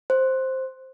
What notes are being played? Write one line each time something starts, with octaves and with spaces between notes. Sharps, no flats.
C5